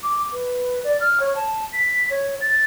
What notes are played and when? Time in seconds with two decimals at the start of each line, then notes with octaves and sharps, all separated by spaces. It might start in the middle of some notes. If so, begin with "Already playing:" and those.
0.03 D6
0.33 B4
0.84 D5
1.00 F6
1.20 C#5
1.35 A5
1.73 B6
2.10 C#5
2.41 A6